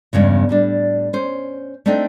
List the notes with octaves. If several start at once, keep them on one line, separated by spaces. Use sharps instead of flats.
E2 G2 C#3 G#3
A2 G3 D4
C#4 C5
A3 C4 D4 D#4 G5